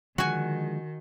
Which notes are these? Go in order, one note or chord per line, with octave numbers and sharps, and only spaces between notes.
D3 D#3 F3 G#3 F#4 G#5